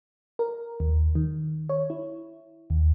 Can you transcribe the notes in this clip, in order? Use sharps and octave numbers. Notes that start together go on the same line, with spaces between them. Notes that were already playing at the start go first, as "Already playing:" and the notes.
A#4
D#2
D#3
C#5
E4
D#2